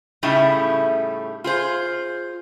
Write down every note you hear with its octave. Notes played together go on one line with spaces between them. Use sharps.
A2 C#3 G3 A3 D#4 E4
F4 G#4 C5